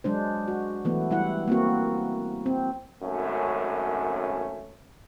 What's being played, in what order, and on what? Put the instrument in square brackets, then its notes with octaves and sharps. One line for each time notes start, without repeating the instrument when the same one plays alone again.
[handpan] F#3 G#3 D4 C5
F#4
E3 F#3 A3 B3
G3 E4 F#5
A#3 C4 F#4
C4
[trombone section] G#1 F#2 A3 C#4